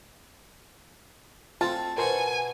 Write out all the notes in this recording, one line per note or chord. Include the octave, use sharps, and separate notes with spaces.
A3 C4 F4 A5
B2 F#4 A#4 C5 G#5